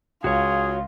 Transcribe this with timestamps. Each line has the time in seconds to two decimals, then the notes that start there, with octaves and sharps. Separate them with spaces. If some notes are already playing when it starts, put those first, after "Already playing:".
0.24 C#2 F4 F#4 G#4 C#5